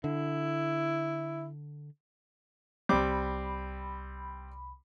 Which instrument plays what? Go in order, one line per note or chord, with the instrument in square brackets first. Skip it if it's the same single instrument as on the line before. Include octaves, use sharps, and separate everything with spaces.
[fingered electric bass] D3 [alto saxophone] E4
[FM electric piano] C2 B5 [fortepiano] G3 C4 D6